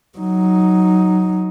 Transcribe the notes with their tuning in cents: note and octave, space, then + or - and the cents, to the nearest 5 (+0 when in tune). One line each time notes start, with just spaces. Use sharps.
F#3 +0 D#4 +0